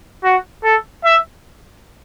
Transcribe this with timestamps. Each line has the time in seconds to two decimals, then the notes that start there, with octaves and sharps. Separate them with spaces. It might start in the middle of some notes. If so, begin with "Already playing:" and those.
0.24 F#4
0.64 A4
1.04 E5